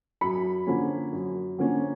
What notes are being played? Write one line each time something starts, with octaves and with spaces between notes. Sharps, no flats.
F#2 B5
D3 F3 A#3 C#4
F#2
D3 F3 A#3 C#4